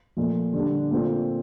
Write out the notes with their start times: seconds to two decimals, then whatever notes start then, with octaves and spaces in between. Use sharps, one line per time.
0.17 A#2 F3 A3
0.54 D3 G3 D4
0.91 A#2 A3 C4 F4